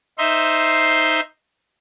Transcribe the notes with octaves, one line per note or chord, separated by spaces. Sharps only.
D#4 C5 E5 C6